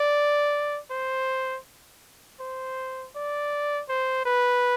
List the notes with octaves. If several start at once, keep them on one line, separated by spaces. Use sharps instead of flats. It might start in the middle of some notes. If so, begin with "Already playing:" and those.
Already playing: D5
C5
C5
D5
C5
B4